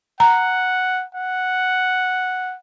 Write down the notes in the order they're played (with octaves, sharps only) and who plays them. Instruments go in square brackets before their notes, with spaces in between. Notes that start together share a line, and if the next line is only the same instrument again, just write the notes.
[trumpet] F#5 [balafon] A#5
[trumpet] F#5